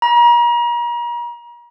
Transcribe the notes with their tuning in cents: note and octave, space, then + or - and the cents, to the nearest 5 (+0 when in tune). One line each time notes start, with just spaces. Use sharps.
A#5 +40